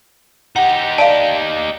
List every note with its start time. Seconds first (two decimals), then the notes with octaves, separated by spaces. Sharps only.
0.56 D#4 G4 F#5
0.98 D5 F5 A5